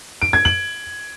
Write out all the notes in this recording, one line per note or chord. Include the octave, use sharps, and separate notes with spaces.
D7
G#6
F#7